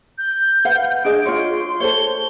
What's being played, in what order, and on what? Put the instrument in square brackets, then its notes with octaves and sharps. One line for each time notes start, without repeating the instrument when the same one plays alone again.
[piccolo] G6
[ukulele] B4 F5 F#5
[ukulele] D4 G#4 D#5 [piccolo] D7
[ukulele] F4 C#5 [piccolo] C6
[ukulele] A4 C5 C#5 [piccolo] G7